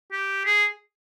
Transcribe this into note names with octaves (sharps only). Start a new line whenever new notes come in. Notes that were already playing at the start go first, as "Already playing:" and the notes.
G4
G#4